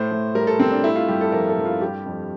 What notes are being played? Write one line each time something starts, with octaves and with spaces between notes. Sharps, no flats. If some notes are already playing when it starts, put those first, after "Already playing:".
Already playing: A2 A3 C5
A2
G3 A#4
A4
G3 C4
D4
A3 E4
F4
G2 G4
A4
F3 A#4
A4
G2
F4
G3 G4
F2